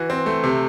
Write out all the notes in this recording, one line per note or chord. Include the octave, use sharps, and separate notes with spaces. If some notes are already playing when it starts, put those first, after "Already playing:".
Already playing: E3 F#4
C4
A3
C3